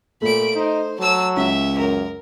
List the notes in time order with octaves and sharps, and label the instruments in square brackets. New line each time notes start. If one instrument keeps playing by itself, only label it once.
[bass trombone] A#2 [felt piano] A3 [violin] B5 D7
[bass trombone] D#4 [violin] C5
[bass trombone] F#3 [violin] A5 E6
[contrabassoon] C#2 [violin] E5
[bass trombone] F#2 [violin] A#4